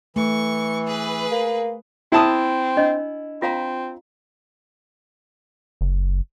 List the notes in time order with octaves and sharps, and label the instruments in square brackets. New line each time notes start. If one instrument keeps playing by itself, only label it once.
[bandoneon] E3 [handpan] A3 [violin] C#6
[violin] G#4 B4
[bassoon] A#3
[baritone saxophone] C4 [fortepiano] E4 A5 D#6
[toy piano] D4 D#5
[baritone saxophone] C4 [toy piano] F4 F5 A#5
[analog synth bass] F#1